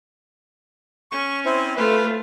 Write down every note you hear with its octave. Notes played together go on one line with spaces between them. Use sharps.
C#4 C#6
C4 E4 C5
A3 F4 B4